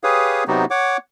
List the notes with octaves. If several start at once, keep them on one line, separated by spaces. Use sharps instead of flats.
G4 G#4 B4 C#5 F5 D#6
C3 F#3 B3 D#4 F#4 G4
C#5 F#5 D6